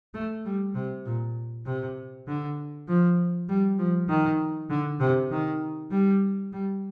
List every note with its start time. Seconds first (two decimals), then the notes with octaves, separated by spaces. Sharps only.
0.14 A3
0.45 G3
0.75 C3
1.06 A#2
1.66 C3
2.27 D3
2.88 F3
3.49 G3
3.79 F3
4.09 D#3
4.70 D3
5.00 C3
5.30 D#3
5.91 G3
6.52 G3